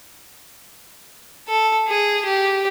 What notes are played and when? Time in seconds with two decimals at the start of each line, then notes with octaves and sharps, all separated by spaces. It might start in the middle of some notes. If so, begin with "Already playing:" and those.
1.48 A4
1.88 G#4
2.25 G4